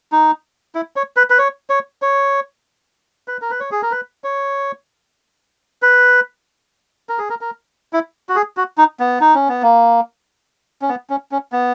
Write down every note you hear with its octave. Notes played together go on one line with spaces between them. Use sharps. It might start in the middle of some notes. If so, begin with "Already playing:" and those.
D#4
E4
C#5
B4
B4
C#5
C#5
C#5
B4
A#4
B4
C#5
G#4
A#4
B4
C#5
B4
A#4
G#4
A#4
A#4
E4
F#4
G#4
F#4
D#4
B3
D#4
C#4
B3
A#3
C#4
B3
C#4
C#4
B3